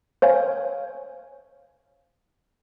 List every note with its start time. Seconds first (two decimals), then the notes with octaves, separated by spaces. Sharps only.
0.22 C5 C#5 F5 G#5